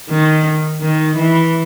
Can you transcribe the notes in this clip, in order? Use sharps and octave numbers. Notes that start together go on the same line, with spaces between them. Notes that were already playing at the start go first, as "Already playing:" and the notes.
D#3
D#3
E3